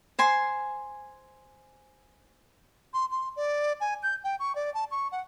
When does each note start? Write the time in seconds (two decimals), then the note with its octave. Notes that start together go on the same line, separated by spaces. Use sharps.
0.19 C5 G#5 C6
2.94 C6
3.11 C6
3.36 D5
3.81 G#5
4.03 G6
4.24 G5
4.40 C#6
4.55 D5
4.74 A5
4.91 C#6
5.12 F#5